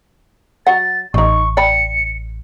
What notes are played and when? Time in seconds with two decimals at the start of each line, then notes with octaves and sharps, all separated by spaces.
0.67 F#3 F#5 A6
1.14 A1 D4 D#4 C#6
1.57 D5 G5 B5 C#7